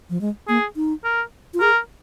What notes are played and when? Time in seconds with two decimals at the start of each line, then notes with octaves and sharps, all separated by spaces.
0.10 F3
0.21 G#3
0.48 A#3 G#4
0.76 D#4
1.04 A#4
1.54 F4
1.61 G#4 A#4